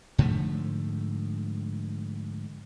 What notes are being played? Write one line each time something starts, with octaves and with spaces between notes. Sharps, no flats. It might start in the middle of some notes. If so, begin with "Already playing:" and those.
G#2 D3 F3 A3